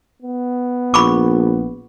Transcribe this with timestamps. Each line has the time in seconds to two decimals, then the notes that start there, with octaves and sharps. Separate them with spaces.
0.22 B3
0.94 A#1 B5 C#6 D6